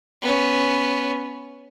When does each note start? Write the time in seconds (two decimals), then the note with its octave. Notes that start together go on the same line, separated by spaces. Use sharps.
0.22 B3 C#4